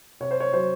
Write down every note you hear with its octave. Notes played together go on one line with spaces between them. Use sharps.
C3 C#5
C5
C#5
F#3 C5